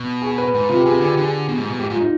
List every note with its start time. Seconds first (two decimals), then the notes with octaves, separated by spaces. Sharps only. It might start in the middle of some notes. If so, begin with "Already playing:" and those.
Already playing: B2
0.22 G#4
0.38 B4
0.54 G#2 B4
0.69 C3 F4
0.76 G4
0.85 C3 G#4
1.01 D3 G#4
1.12 G4
1.17 D3
1.23 G#4
1.49 B2
1.58 G#2
1.69 B2
1.79 G#2 G4
1.90 G#2 F4
2.01 D#4